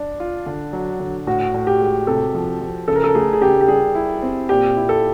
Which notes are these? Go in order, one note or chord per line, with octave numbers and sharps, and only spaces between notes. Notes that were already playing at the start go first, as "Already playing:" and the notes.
Already playing: D4
F4
D3
F#3
D3
A2 F#4
A2
G4
G#3
C3 A4
F3
F3
C#3 A4
A#4
A4
A3 G#4
G#4
C#3 G4
G4
G3 G#4
E4
C4
A#2 G4
E4
A4